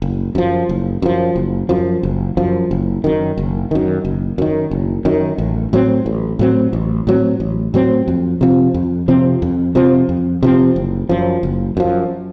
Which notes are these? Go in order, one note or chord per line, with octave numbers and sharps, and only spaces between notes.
F#1
F#2 F3
F#1
F#2 F3
F#1
F#2 F3
F#1
F#2 F3
F#1
F#2 D#3
F#1
F#2 D#3
F#1
F#2 D#3
F#1
F#2 D#3
A1
A2 F#3 C4
A1
A2 F#3 C4
A1
A2 F#3 C4
A1
A2 F#3 C4
F2
C3 F3 C4
F2
C3 F3 C4
F2
C3 F3 C4
F2
C3 F3 C4
F#1
F#2 F3
F#1
F#2 F3